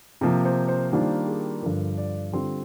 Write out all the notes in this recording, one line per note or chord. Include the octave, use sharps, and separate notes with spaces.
C3 F3 A#3
C5
C5
D#3 G3 A#3 D4 F4 C5
G#4
G2 D3 F3 A#4
D5
D3 G3 C4 F4 C6